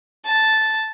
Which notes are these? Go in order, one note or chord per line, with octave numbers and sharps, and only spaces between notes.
A5